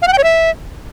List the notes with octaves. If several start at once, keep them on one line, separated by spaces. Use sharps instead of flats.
F5
F#5
G5
C#5
E5